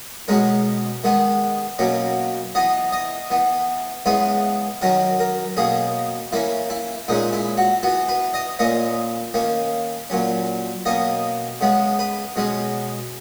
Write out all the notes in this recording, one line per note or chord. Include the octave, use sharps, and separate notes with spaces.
B2 G#3 C#4 A#4
D#3 G#3 B3
B2 F#3 A#3 C#4
E3 B3 D#5
D#5
E3 B3
C#3 E3 G#3 B3 B4
D#3 F#3 C#4 A#4
A#4
B2 A#3 C#4 G#4
E3 A#3 C#4 E4
E4
A#2 G#3 C#4 D#4
E4
F#4
E3 B3 F#4
B4
D#5
A#2 A#3 C#4 D#5
D#3 A#3 C#4
A#2 F#3 C#4
B2 A#3 C#4 D#5
C#3 G#3 B3
B4
B2 G#3 C#4